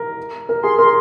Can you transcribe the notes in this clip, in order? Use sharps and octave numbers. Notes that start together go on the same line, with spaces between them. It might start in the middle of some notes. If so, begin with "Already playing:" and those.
Already playing: A#4
A#4
G#4 C6
A#4 C6